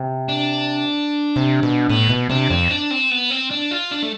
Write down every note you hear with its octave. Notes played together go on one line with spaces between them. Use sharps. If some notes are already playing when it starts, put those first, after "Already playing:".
Already playing: C3
D4
C3
B2
A2 B3
B2
C3 D4
F2 C4
D4
C4
B3
C4
D4
F4
D4
A3